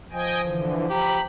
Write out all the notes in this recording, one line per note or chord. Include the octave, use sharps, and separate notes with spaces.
F3 D#5 G5 G#5
D3 E3
G4 A#5 B5